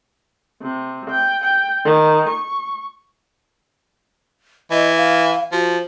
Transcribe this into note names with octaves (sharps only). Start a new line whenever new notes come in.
C3
G5
G5
D#3
C#6
E3 D#5
F5
F3 F#4